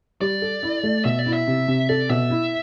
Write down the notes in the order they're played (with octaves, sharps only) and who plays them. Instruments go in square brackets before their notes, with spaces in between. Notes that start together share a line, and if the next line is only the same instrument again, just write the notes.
[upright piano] G3 [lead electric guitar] D5
[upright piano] A4
E4
A3
[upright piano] B2 [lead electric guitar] E5
[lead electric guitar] D5
[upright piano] E4
[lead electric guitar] E5
[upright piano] C3
C3
[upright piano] A4 [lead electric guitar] D5
[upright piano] B2 [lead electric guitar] E5
[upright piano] E4